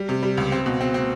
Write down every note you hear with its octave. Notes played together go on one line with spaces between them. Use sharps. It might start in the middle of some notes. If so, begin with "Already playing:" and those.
Already playing: G3
C3
G3
C#2
C4
B2
C4
C4